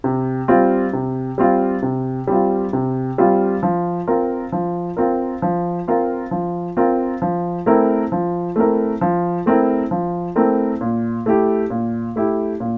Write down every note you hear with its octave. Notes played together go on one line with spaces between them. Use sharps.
C3
G3 C4 F4
C3
G3 C4 F4
C3
G3 C4 F4
C3
G3 C4 F4
F3
C4 F4 A#4
F3
C4 F4 A#4
F3
C4 F4 A#4
F3
C4 F4 A#4
F3
A3 C4 E4 A#4
F3
A3 C4 E4 A#4
F3
A3 C4 E4 A#4
F3
A3 C4 E4 A#4
A#2
A3 E4 G4
A#2
A3 E4 G4
A#2